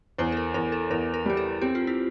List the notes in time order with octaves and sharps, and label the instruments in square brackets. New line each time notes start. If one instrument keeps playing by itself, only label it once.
[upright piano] E2 [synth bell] C5
[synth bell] A4
A#4
[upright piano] E2 [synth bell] A#4
[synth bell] A4
[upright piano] E2 [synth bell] A#4
[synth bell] A#4
[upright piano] G3 [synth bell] G4
[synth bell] A4
[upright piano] C4 [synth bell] G4
[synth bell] F4
E4